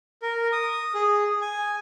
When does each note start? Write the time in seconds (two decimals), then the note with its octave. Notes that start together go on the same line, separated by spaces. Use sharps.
0.22 A#4
0.52 D#6
0.94 G#4
1.41 G#5